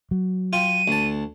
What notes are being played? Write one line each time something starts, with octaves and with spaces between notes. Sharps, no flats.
F#3
F4 G5 D#7
D2 A5